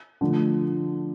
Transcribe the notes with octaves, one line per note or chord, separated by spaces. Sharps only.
D3 F3 A3